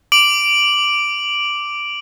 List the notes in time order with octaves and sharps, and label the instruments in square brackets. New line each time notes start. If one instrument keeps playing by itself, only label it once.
[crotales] D6 D7 F#7